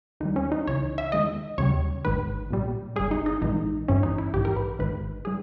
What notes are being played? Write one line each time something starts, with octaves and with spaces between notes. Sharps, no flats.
D#2 D#3 G3 D#4
C#4
D#4
C#2 C#3 E3 C#5
E5
E2 D#3 G#3 D#5
D#2 C#3 G3 C#5
G#1 G#2 D#3 B4
B1 A#2 G3
G1 G2 G3 G#4
D#4
D#4
A#1 G#2 E3 G#3 D#4
G#1 G2 E3 C#4
D#4
E4
A#1 G#2 E3 G4
A#4
B4
G#1 G#2 D#3 G#3 B4
E3 G3 G#4